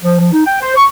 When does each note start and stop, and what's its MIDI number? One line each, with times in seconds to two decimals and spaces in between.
0.03 0.17 53
0.19 0.30 53
0.33 0.44 63
0.45 0.56 79
0.61 0.75 72
0.75 0.86 85